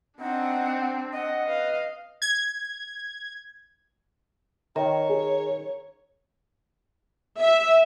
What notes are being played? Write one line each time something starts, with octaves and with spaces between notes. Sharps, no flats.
C4 D4 D#4 F#5
D#5 F#5
B4 F5
G#6
D#3 C#5 A#5
G#4
E5